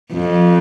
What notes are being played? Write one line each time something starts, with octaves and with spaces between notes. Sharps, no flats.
F2